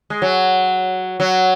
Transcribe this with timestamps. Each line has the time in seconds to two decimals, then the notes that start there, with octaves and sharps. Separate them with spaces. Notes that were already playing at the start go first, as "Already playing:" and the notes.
0.10 G#3
0.22 F#3
1.20 F#3